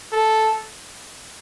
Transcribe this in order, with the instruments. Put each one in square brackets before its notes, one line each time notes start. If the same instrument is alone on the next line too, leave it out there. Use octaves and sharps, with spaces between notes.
[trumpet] A4